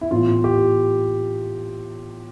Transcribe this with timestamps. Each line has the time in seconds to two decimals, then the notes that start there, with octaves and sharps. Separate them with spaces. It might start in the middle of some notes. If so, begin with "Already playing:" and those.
0.01 E4
0.11 A2 E3 B3 F4
0.44 G4